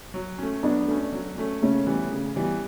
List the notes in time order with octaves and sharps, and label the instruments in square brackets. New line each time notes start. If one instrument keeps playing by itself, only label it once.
[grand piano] F#3
A3 C#4
[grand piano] F#3 [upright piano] B3 D4
[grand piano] A3 C#4
F#3
A3 C#4
[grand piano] C#3 [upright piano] A3 C#4
[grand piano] E3 G3 B3
C#3
E3 G3 B3